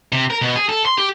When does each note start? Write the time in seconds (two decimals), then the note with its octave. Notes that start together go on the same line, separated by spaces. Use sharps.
0.12 C3
0.30 A#4
0.41 B2
0.56 G#4
0.69 A4
0.86 C6
0.98 G4